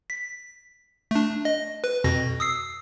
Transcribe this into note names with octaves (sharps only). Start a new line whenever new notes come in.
B6
A3 D4
D#5
B4
F2 B2 A#6
D#6 E6 C7